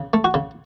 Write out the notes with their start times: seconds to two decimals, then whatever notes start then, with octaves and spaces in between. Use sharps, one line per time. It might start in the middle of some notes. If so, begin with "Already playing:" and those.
Already playing: C#3
0.13 A3
0.24 F#4
0.34 C#3